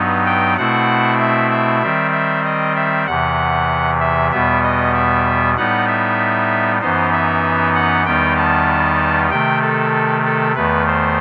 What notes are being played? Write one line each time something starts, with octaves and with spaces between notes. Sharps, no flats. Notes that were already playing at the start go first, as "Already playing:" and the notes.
Already playing: G2 F#3 B3 D#4
G5
B2 A3 C4 E4 F#5
E5
E5
D#3 G3 C4
E5
D#5
E5
E2 C3 E3 F#5
E5
E2 B2 G3 B3 E5
D#5
E5
A2 G3 B3 D#4 F#5
E5
F#2 E3 B3 D#4 C5
E5
F#5
E2 D#3 G3 B3 D#4 G5
A5
C3 D#3 A3 G5
A4
A4
E2 D#3 A3 B4
C5